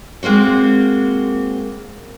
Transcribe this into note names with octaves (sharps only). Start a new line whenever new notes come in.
G#3 A#3 C4 F#4